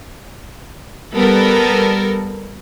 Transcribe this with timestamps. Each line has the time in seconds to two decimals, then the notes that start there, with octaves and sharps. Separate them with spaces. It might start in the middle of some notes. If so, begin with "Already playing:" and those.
1.14 G3 B3 A4 A#4